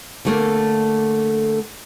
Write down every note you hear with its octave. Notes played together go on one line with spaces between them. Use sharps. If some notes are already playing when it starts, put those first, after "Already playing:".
D3 A3 A#3